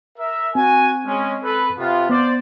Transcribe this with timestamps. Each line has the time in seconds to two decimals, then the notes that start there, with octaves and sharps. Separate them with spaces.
0.18 A#4 E5
0.55 C4 F#4 G#5
1.06 G#3 C#4
1.43 A4 B4
1.78 C3 B3 F4
2.10 B3 C5 D5